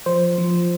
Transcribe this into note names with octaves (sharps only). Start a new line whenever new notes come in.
F3 C5
F3